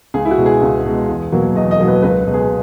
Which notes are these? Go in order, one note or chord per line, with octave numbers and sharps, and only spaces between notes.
C#2 G#4
E4
F#4
B2 G#3
G#4
C#2
B2 G#3
E2
B2 F#3 A#3
E2 D#5
D#5
B2 F#3 A#3
B4
C#2 B4
B2 G#3
G#4